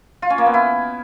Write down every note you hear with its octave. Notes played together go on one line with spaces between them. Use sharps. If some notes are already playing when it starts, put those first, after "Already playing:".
F4
C#4
A#3
B3
E4